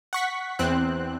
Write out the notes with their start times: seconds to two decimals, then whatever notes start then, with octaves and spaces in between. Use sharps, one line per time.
0.13 F#5 C#6 B6
0.59 E2 C4 F#6